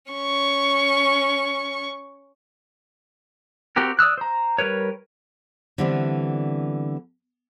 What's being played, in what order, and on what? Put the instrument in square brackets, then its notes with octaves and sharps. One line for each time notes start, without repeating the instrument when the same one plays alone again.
[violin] C#4 C#6
[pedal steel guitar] C4 F#4 G4 A#4
D5 D#6 E6 F#6
C5 A#5
G3 A#4 B4 C#5
[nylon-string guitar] D3 E3 G3 B3 C4 D4